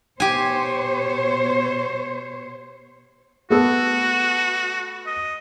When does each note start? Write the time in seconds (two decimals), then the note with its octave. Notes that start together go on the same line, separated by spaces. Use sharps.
0.20 B2 G4 C5 C#5 G#5
3.50 A3 B3 F#4 A4
5.06 D#5